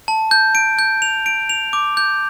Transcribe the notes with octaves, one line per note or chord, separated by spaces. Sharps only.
A5
G6
D7
G6
F7
D7
F7
D6
G6